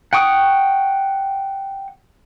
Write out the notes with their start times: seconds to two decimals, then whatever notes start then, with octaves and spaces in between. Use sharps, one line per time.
0.13 F#5 G5 C#6 D#6